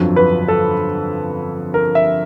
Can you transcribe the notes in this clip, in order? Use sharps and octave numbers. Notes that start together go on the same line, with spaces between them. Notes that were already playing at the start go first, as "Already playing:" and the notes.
Already playing: G1 F2 D3 F#3
B4
A4
A#4
E5